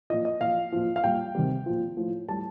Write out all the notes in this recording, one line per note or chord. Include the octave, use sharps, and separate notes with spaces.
A#2 F3 D#5
D#5
A#2 F3 F5
A#2 F3
F5
A#2 G3 G5
C3 D#3 G3
A#2 F3
A2 F3
A2 G3 A5